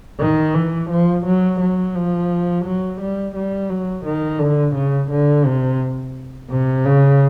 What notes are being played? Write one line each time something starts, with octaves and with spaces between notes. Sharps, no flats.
D#3
E3
F3
F#3
F#3
F3
F#3
G3
G3
F#3
D#3
D3
C#3
D3
C3
C3
C#3